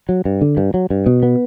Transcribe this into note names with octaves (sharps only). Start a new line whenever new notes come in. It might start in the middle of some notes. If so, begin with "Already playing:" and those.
F#3
G2
D3
G2
F#3
G2
B2
B3